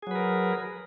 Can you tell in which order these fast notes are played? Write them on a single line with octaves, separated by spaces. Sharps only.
G#4 F#3 B4 A#4